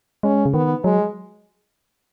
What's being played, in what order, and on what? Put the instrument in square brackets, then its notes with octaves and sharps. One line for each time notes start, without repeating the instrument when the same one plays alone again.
[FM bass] G#3 [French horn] C#4
[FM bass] C#3
[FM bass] D#3 [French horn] B3
[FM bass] F#3 [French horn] G#3